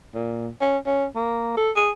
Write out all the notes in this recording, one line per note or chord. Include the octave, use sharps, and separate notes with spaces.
A#2
C#4
C#4
A#3
A4
G#4